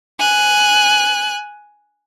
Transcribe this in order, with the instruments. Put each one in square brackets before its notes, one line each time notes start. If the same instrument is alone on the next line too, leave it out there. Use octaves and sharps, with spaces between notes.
[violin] G#5 F#6